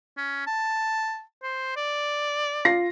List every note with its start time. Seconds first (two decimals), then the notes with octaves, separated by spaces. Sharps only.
0.17 C#4
0.47 A5
1.42 C5
1.77 D5
2.65 F4 A#6 C7